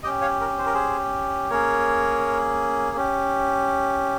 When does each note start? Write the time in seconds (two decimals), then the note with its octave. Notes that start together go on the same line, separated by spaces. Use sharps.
0.03 C#4 G4 D#5 G5
0.22 C#5 F5
0.41 A#4
0.58 C5
0.66 A#4
0.74 G#4 C5
1.50 A#3 C#4 G#4 A#4 C#5
2.97 C#4 G4